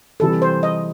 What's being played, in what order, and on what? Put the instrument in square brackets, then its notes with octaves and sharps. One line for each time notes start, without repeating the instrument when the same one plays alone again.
[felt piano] C3 E3 G3 [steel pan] A4
[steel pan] C5
D#5